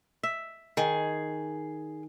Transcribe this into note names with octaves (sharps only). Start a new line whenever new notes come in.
E5
D#3 G#4